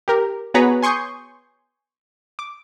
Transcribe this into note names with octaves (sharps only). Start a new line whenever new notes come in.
G4 A#4
B3 F#4 G#4 B4 C#5 A#5
G#5 C6 C#6 D#6 G6
D6